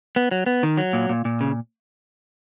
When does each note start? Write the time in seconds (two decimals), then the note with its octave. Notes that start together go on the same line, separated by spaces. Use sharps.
0.16 B3
0.31 F#3
0.46 B3
0.63 D#3
0.77 F#3
0.93 A#2
1.09 A#2
1.25 A#2
1.41 C#3